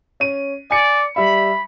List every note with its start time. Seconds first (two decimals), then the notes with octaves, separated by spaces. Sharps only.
0.20 C#4 D#7
0.71 D5 G#5 C#7
1.16 G3 E5 B5